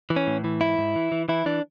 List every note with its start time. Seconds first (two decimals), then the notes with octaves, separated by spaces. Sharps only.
0.10 E3
0.16 C#4
0.27 A2
0.44 E3
0.61 G#2 E4
0.78 G#2
0.96 E3
1.12 E3
1.29 E3 E4
1.46 E3 D4